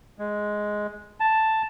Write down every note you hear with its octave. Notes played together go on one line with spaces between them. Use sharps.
G#3
A5